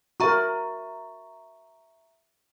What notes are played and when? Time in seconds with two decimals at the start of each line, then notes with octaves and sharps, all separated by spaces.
0.20 F#4 A#4 E5 A#5 C#6